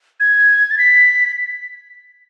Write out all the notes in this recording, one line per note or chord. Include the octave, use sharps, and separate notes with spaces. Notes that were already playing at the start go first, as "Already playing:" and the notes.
G#6
A6
B6